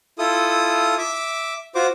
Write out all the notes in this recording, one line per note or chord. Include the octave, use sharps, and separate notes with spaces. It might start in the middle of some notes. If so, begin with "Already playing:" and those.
E4 F4 A4 D#6
E5 D6
F4 F#4 C5 D6